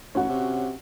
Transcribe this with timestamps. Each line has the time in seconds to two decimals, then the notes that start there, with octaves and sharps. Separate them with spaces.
0.15 A1 C#4 F#4
0.29 C3